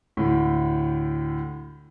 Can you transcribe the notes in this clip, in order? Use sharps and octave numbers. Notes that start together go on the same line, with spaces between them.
D2 A2